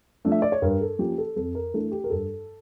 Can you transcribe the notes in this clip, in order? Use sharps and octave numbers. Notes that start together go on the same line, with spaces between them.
F3 A3 D4
E5
D5
C#5
G2 A#4
A4
F3 A#3 C#4 G4
A4
F2 A4
A#4
E3 A3 D4 A4
G4
A#4
G2 A4